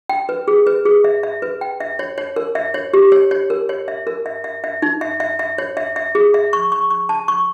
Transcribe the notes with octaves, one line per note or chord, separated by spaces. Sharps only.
G5
B4
G#4
B4
G#4
E5
E5
B4
G5
E5
C#5
C#5
A#4
E5
C#5
G4
C#5
C#5
A#4
C#5
E5
A#4
E5
E5
E5
D#4
E5
E5
E5
C#5
E5
E5
G#4
E5
C#6
C#6
C#6
A5
C#6